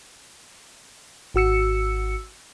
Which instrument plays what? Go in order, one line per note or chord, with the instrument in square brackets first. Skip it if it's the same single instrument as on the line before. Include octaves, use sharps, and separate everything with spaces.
[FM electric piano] G#1 F#4 E6 C#7